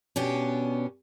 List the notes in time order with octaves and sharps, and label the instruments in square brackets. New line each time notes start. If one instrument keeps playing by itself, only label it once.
[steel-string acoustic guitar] B2 B3 C#4 D4 G4